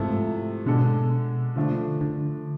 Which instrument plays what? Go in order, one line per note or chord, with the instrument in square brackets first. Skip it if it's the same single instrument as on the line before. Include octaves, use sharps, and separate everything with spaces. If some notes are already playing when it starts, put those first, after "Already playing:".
Already playing: [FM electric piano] G#2 [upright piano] C3 F3 A3 E4 A4
[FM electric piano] B2 [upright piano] D3 G#3 D4 A4
[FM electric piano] D3 [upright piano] F3 A3 D4
[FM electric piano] D3